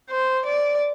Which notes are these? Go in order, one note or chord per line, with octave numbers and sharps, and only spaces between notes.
C5
D5